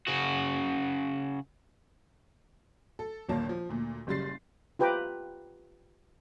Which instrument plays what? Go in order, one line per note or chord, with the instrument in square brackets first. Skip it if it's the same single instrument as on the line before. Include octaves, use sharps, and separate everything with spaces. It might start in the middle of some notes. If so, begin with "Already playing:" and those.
[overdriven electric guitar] C#3 F#4
[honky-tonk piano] A4
G1 D#2 A#2 A#3 C#5 A5
F3
D2 A#2
F#1 C#3 G3 C6 A6 C7
[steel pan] F4 G4 B4 G5 A#5 D6